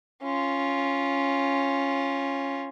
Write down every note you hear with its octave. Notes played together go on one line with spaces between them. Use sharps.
C#4 F4